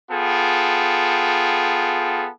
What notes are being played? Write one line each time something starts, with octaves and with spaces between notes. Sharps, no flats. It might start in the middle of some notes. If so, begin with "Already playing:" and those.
B3 F4 G#4 A4 G5